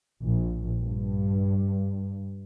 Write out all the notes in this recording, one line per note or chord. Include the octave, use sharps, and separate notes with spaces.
A#1
G2